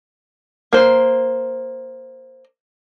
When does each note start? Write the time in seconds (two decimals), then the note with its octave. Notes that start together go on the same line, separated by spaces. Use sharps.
0.73 A#3 C5